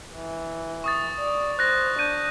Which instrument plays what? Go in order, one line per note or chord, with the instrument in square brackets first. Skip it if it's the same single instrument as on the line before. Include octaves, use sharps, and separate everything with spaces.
[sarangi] E3
[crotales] C#6 D#6 A6
[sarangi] D5
[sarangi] C5 [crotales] F#6 A#6
[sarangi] D4 [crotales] G6 D#7